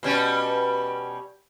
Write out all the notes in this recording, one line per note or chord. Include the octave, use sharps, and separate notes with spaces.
B2 G3 C#4